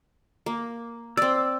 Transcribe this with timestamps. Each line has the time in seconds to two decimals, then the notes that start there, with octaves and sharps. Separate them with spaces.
0.46 A#3
1.17 C4 D5 E6